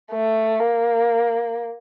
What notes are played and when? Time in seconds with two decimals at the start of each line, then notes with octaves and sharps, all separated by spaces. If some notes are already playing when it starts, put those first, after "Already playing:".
0.12 A3
0.60 A#3